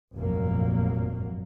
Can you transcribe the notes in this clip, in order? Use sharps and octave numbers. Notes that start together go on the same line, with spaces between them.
F1 A#1 G2 F#3 A#3